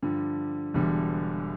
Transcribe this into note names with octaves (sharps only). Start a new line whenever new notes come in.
G2 D3 F3
E1 E2 D3 G3